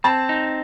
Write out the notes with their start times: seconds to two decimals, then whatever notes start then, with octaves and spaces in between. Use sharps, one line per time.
0.04 C4 A5
0.29 D#4